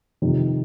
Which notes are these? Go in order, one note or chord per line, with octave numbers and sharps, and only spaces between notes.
F2 C3 D#3